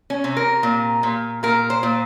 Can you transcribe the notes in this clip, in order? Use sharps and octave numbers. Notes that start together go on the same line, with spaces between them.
C#4
C3
A#4
A#2
A#2
A#2 A#4
C5
A#2